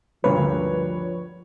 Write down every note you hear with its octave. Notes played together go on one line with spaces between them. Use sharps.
D2 G2 F3 A#3 B4 C#5